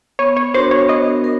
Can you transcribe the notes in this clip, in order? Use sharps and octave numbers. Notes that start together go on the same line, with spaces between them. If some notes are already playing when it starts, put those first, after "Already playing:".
B3 C#5
C#5
D4 F#4 A#4 C5
C#5
B3 D#5
A#4